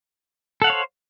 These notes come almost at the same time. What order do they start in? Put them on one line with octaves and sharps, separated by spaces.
A4 F#5 F5 C#5 C5